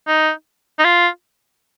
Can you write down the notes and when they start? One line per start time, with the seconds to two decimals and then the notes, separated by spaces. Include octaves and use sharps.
0.07 D#4
0.79 D#4
0.84 F4